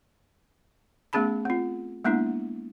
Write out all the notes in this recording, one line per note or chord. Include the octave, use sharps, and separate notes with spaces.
A3 B3 C#4 G#4 A5 B5
C4 F4
G#3 A#3 B3 D4 E4